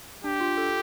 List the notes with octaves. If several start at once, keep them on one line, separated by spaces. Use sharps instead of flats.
D4 G4
F4
A4